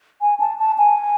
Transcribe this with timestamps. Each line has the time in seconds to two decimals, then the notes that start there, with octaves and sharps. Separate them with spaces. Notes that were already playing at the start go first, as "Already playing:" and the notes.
0.21 G#5
0.40 A5
0.59 A5
0.78 G#5